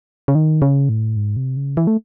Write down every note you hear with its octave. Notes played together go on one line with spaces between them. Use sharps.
C#3
D#3
C#3
A2
G#2
C3
C#3
E3
A3